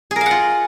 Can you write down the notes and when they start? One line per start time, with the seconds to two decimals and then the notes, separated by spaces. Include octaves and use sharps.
0.11 G#4
0.16 A#4
0.21 F5
0.26 F#5
0.31 F4